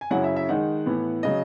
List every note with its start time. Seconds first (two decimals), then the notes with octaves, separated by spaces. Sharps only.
0.01 G#5
0.11 F#2 C#3 F#3 C#4 E4 F#5
0.24 E5
0.36 E5
0.49 D#3 G#3 D#4 F#5
0.86 A2 E3 B3
1.23 C#3 F#3 D#5